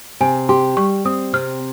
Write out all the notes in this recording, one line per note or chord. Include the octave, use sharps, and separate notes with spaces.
C3 G#5
G4 C6
G3 C#6
C4 D#6
C3 F6